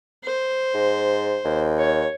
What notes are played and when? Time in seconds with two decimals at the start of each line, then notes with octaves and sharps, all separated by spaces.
0.24 C5
0.74 G#2
1.45 D#2
1.79 C#5